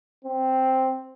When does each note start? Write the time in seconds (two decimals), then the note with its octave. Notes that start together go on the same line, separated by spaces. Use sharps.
0.25 C4